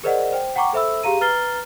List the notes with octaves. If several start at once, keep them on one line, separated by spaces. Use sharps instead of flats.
G#4 A#4 C5 D5 D#5 F#5
C5 G5
F#5 G5 A#5 C#6 D6
A4 C5 E5 B5 E6
G4 G#4 F5 A#5 D#7
B4 A#5 F6 A6 C7 G7